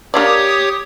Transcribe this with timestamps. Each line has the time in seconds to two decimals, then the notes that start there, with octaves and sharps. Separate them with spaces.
0.14 A#3 D4 G4 C#5 D5 D#6